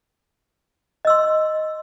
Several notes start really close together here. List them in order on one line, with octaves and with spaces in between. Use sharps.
D#5 E6 C6